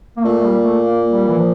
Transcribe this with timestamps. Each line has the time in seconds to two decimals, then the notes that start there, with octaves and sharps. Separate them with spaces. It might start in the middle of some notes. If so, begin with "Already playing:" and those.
0.17 A#3
0.25 A#2 A3
0.39 A3
0.44 G3
0.63 A3
0.82 A#3
1.10 G3
1.28 E3
1.38 F3